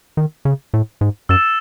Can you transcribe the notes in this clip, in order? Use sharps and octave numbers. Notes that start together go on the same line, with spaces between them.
D#3
C#3
A2
G#2
F#2 E6 A6 E7